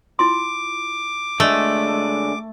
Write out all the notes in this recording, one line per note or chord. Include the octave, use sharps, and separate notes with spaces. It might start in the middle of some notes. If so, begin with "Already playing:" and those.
E4 F4 C6 D6
D3 G#3 A3